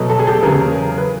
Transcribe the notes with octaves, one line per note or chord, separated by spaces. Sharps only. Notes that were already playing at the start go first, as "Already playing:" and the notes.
Already playing: B2 F#3 A3
A4
G#4
G4 A4
E2 C#3 F#3 G#4 A#4
B4